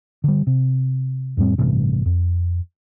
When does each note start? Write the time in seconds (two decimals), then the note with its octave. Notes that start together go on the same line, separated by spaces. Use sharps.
0.24 D3 G3
0.47 C3
1.37 F2 A2 G3 C4
1.58 A1 G2 C3
2.06 F2